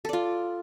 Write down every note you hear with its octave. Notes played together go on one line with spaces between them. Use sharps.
F4 A4 D5